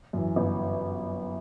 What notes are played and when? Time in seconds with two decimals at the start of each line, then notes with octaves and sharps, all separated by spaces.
0.13 F#2 E3
0.36 G1